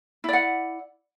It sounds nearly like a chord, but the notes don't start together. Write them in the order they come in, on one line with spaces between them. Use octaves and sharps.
E4 D5 F#5